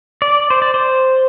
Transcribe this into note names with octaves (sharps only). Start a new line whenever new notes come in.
D5
C5
D5
C5